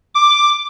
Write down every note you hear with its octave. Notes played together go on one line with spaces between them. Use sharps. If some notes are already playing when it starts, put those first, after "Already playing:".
D6